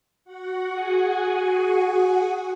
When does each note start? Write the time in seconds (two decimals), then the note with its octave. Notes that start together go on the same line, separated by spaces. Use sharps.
0.24 F#4 F#5
0.72 G#4 G#5
1.19 F#4 F#5
1.50 F#4 F#5
1.82 F#4 F#5
2.13 F#4 F#5